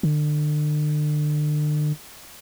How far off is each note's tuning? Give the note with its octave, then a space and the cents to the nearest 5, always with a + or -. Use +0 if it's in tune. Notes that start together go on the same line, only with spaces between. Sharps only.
D3 +35